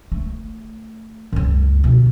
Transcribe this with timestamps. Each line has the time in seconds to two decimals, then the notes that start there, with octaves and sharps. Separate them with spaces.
0.12 A3
1.32 C#2 F#2
1.84 B2 D3